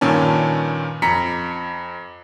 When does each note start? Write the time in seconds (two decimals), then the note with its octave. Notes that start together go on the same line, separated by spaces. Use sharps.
0.01 G2 A#2 D#3 C#4 A5
1.02 F2 A#5 B6 C#7